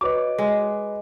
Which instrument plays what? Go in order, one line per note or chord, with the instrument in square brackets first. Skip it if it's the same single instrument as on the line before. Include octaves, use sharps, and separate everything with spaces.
[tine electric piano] F#4 C#5 D#5 [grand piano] B4 D6
[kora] G#3